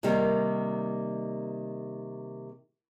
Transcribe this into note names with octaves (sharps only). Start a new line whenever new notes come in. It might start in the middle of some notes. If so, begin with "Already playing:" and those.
C3 D#3 G3 A#3